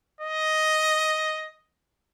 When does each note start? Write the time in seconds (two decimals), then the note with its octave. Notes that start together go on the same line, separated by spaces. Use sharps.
0.21 D#5